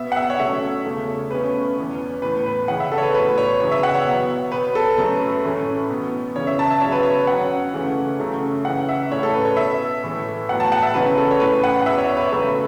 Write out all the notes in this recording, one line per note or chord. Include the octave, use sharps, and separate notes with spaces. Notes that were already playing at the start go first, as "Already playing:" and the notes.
Already playing: B2 B3 E5
F#5
E5
C#5
B2 F#3 A3 C#4 E5
E2 C#3 A3
B2 A3 C#4 B4
E2 E3 B3
A2 E3 B3 B4
B4
C#3 E3 C#4 F#5
E5
A4
C#5
B4
A2 F#3 B3 B4
C#5
F#2 C#3 E3 B3 C#5
E5
F#5
C#5
B2 F#3 B3
B2 B3 B4
A4
F#2 F#3 A3 C#4 B4
A2 E3 A3 C#4
B2 B3
C#3 E3 C#4 C#5
E5
A5
E5
F#2 C#3 F#3 B3 C#5
B4
C#5
F#2 F#3 C#4 F#5
C#3 E3 A3 C#4
F#2 C#3 A3 C#4
C#3 E3 C#4 F#5
E5
A2 A3 C#4 C#5
A4
B4
C#5
B2 B3 E5
A2 E3 A3
A2 F#3 B3 F#5
A5
F#5
E5
F#2 C#3 E3 C#4 B4
A4
C#5
A2 E3 C#4 B4
F#5
F#5
E2 B2 B3 E5
C#5
E5
B4
C#5
F#2 C#3 A3 C#4 B4